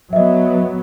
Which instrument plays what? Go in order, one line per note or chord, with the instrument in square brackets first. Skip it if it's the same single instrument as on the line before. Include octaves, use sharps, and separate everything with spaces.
[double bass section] F#3 B3 [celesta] D#5 E5